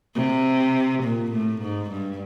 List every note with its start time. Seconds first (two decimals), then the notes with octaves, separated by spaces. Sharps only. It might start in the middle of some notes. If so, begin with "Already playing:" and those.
0.16 C3
1.03 A#2
1.32 A2
1.62 G#2
1.91 G2